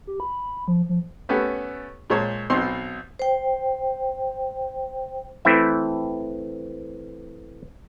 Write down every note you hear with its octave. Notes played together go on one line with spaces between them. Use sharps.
G4
B5
F3
F3
A3 B3 C#4 G4 A4 B4
A#2 G#3 C5 C#5 A5
B1 B2 C4 C6
C5 G5
E3 A3 C4 E4 E5